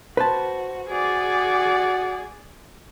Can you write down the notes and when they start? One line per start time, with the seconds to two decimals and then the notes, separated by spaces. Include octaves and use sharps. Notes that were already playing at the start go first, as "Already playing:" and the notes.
0.17 F#4 B4 C5 A5
0.90 F#4 G#4 D5